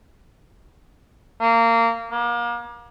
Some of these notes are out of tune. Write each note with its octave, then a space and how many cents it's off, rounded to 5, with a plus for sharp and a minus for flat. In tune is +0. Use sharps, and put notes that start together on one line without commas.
A#3 -20
A#3 +35